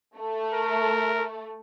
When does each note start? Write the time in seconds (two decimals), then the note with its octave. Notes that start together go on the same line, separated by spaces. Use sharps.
0.17 A3
0.53 A#4